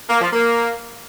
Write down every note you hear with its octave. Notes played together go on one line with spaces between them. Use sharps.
A#3
F3
A#3